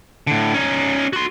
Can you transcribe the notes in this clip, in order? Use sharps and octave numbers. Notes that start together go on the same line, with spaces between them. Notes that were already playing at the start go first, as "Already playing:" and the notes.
A2 D3
C#4 D#4
F#4 C6